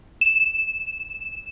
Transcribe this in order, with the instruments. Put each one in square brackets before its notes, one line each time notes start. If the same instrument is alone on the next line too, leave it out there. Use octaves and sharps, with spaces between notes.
[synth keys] E7